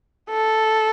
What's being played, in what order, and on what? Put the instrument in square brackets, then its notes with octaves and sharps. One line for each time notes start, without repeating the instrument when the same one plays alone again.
[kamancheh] A4